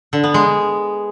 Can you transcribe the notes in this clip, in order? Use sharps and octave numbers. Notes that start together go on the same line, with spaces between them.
D3
B3
G#3